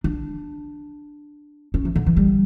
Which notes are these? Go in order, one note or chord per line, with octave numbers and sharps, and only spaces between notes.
D4
C#4
E3
D3
E3
G3